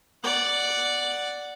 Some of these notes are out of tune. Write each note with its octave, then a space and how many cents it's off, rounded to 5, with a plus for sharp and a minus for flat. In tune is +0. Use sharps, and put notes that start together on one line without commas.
D5 +0 F#5 +0